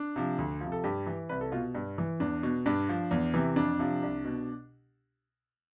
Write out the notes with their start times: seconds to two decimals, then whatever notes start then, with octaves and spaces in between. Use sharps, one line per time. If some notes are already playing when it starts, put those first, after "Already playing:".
Already playing: D4
0.16 C3 F3
0.38 D2
0.61 F3
0.66 C3
0.72 A4
0.84 G2 G4
1.07 E3
1.29 C2 B4
1.41 A4
1.52 B2 F4
1.75 G2
1.98 E3
2.20 E2 D4
2.43 B2
2.66 G2 D4
2.89 F3
3.11 E2
3.34 C3 E3
3.56 F2 D4
3.79 C3 F3
4.03 C2
4.25 B2